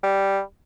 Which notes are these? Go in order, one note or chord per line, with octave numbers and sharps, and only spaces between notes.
G3